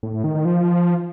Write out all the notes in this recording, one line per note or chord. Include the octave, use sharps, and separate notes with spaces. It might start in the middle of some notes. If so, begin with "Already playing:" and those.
A2
A2
D#3
D#3
F3